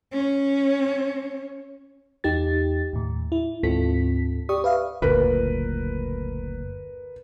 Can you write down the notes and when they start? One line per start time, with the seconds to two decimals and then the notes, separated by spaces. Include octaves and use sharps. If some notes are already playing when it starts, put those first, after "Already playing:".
0.12 C#4 C#5
2.24 E2 D#4 G4 A6
2.93 D#2 A2
3.32 E4
3.63 D2 G#2 C4 F4 A4 B6
4.49 G4 D5 C#6 D#6
4.64 B4 E5 F5
5.02 F#1 D2 A#2 A#4 B4